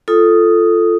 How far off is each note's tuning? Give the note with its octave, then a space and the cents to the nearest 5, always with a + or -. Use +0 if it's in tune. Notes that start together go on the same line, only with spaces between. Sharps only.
F4 -15 A4 +0 D#6 +0